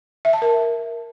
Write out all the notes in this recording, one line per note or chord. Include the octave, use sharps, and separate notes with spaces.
E5
A5
A#4